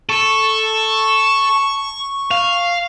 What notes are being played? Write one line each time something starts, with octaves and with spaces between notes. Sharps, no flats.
A4 C#6
F5